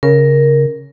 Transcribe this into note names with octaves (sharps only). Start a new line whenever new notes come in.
C#3 A#4